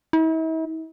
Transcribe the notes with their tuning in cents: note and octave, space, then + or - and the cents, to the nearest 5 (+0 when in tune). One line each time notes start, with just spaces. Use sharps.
E4 -45